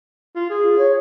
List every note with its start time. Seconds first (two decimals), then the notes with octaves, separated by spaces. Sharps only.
0.36 F4
0.50 G#4
0.63 F4
0.78 C#5